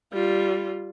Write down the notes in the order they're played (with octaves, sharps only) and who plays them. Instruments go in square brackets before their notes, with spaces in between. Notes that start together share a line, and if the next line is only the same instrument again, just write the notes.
[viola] G3 F4